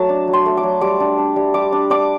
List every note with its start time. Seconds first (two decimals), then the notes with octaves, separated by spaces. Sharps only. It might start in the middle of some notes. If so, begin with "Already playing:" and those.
Already playing: F#3 A3 A5
0.09 D4
0.28 F#3
0.33 C6
0.46 A3
0.57 D6
0.63 F#3
0.81 G3 D6
1.00 D4
1.18 D4
1.36 G3
1.54 G3 D6
1.72 D4
1.90 D4 D6